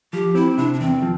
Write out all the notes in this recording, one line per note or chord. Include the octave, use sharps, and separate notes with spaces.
F3 G4
C4 E4
C3 D4
D4
E2 C4
F3